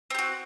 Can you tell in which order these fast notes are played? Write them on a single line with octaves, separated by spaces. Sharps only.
C4 G4 F#4